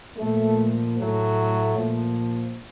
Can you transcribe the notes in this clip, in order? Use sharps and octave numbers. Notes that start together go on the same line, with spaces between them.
A#2 F3 A3
A2 F#3 A3
A#2 F3